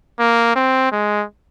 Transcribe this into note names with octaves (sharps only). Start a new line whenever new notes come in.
A#3
C4
G#3